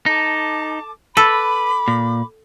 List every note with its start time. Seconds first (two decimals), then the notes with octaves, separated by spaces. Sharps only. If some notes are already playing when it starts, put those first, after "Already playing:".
0.06 D#4 A4 A5 D6
1.17 A4 B4 B5 D6
1.88 A#2